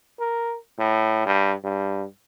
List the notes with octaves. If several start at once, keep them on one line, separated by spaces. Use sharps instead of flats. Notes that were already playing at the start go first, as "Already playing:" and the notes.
A#4
A2
G2
G2